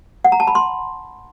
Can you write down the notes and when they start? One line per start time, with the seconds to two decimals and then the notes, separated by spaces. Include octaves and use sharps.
0.25 F#5
0.32 A#5
0.40 A5
0.48 B5
0.55 C6